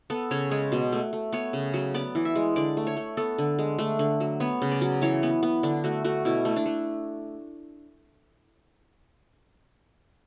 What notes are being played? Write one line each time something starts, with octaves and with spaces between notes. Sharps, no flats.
B3 A4
C#3 C#5
G#3 C#5
B2
A3
A3
B3 C#5
C#3
F#3
B3 D5
E3
E5
G#3
D3 D5
A3
C#5
A3
B3 A4
D3
G#3
A3 D4
D3
F#3
B3 C#5
C#3
D5
F#3
E3 C#5
B3
B3
D3 D4
A3 F#4
A3 F#4
B2 E4
A3
D4
A3